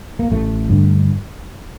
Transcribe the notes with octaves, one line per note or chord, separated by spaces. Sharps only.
A#3
A1 A3
G2 D3